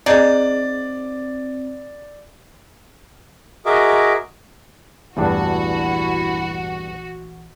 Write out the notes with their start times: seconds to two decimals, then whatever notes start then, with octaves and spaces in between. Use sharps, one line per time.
0.06 C4 D#4 G#4 D5
3.66 F#4 G#4 A#4 D#5 E5 D6
5.17 A#1 E2 G2 E3 A3 D4 E4 F#4